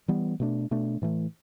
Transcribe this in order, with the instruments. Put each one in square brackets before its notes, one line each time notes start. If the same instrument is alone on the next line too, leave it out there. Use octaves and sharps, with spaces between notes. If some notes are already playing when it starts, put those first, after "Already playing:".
[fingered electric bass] E3 G3 B3
B2 A3 D4
B2 A3 D4
A2 E3 A3